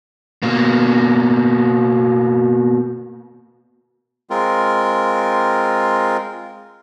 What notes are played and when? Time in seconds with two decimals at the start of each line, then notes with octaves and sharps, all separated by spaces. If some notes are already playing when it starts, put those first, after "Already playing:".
0.43 B2 A#3
4.30 G#3 C4 F4 A#4